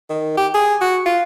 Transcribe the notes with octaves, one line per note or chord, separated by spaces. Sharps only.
D#3
G4
G#4
F#4
F4